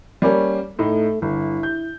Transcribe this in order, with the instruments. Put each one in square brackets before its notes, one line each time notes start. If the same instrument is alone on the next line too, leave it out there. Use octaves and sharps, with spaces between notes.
[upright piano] G3 A#3 C#4
[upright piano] A2 D#4 [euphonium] A3
[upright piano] G1 [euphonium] E4
[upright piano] G6